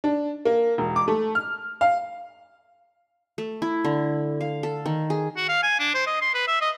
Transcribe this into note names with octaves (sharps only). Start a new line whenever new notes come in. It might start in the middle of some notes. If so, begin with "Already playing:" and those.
D4
A#3
E1
D6
A3
F6
F5
A3
E4
D3
F5
A4
D#3
G#4
F#4
F5
G#5
D4
C5
D#5
C6
B4
E5
D#5